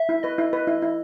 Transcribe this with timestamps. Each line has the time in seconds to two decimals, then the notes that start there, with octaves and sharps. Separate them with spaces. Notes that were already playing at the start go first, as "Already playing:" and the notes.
Already playing: E5
0.09 E4
0.23 B4 D#5
0.38 E4
0.53 B4
0.67 E4
0.82 E4